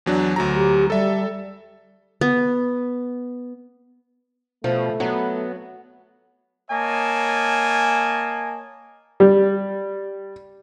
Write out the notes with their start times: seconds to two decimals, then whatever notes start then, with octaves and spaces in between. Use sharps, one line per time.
0.06 E2 F#3 D4
0.36 D2 F#3 A#5
0.55 G4
0.90 G3 A4 E5
2.21 B3
4.64 B2 F3 A3
5.00 F#3 B3
6.71 A#3 C#5 D#5 G#5 A5
9.20 G3